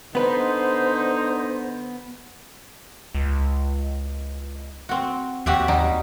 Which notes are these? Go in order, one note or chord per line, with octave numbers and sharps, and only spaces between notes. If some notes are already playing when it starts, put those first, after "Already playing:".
D3 B3 D#4 B4 C5
C#2
C4 F#4
D#2 F#4 G4 E5
F#3 G3 D#4